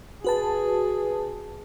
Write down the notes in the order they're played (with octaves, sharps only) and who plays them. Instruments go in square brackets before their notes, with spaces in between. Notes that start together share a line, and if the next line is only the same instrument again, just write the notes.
[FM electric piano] F#4 B4 A5 [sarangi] G#4